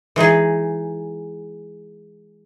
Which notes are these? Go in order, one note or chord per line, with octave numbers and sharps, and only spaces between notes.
E3 G#3 D#4 G#4